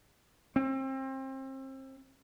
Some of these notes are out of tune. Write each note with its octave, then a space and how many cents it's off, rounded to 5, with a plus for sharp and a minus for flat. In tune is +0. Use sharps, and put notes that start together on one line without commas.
C4 +30